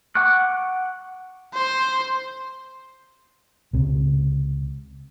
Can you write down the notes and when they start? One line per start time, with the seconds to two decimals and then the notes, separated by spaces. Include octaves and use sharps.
0.15 F#5 C#6 D6 F#6
1.54 C5
3.73 C#2 C3